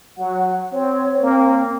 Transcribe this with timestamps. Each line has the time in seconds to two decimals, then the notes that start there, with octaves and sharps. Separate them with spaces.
0.18 F#3 F#5
0.73 C4 C#5
1.22 A#3 C4